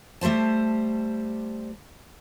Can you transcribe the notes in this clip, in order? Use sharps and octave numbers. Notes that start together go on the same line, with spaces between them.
G3 A3 G4 C5 A5